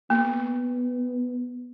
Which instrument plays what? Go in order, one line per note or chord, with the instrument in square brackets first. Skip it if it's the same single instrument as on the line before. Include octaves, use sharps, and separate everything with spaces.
[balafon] A#3 [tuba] B3